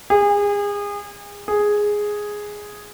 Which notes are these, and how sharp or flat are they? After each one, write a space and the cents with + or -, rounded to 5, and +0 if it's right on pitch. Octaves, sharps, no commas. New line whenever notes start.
G#4 -30
G#4 +0